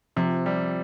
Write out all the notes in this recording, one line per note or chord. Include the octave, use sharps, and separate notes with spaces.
C3 F3
G3